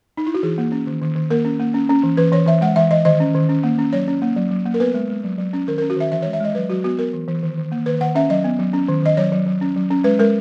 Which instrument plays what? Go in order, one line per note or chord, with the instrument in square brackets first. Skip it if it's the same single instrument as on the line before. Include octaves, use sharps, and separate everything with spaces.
[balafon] D#4
E4
F#4
E3 G#4
A#3
C#4
D#3
D#3
D#3
A#3 A#4
C#4
A#3
C#4
C#4
E3
E3 B4
E3 C#5
E3 E5
G#3 F#5
E3 E5
E3 D#5
D#3 D#5
C#4
D#3
C#4
A#3
C#4
F#3 C#5
C#4
A#3
F#3
F#3
A#3
A#4
B3 B4
G#3
G#3
F#3
F#3
C#4
D#3 A#4
A#4
C#4
F#4
D#3 E5
E3 E5
C#5
G#3
E5
G#3 D#5
F#3 B4
F#3 F#4
B3 F#4
B3 A#4
E3
E3
D#3
D#3
A#3
D#3 B4
D#3 F#5
C#4 E5
F#3 D#5
B3
F#3
C#4
D#3
D#3 D#5
F#3 C#5
F#3
F#3
C#4
F#3
C#4
G#3 B4
G#3 A#4